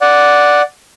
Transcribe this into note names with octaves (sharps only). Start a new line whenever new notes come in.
D5 F#5